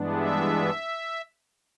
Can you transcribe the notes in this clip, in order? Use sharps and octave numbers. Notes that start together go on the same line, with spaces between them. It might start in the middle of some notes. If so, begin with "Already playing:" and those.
Already playing: G2 E3 G#3 B3 D4
E5